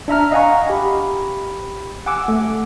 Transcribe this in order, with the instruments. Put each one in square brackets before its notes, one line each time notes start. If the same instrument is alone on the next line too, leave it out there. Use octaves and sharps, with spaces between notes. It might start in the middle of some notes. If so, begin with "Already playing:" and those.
[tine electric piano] D4 E5 A#5 F6
D#5 F5 F#5 G#5 A#5 C#6
G4 B5
F#5 G#5 D6 E6
A3